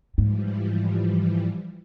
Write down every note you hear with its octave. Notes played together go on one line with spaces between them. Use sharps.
G#2 E3 F3 G3